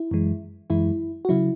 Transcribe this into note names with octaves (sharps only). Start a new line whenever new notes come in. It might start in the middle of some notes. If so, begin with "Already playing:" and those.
Already playing: E4
F#2 E3 G#3
F#2 E3 G#3 E4
F#4
C#3 F#3 E4